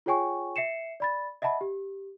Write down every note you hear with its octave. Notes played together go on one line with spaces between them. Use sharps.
F4 G#4 C#5 G5 G#5 C#6
E5 C7 C#7 E7
D5 B5 A6
D#5 E5 F#5 A5 B5
G4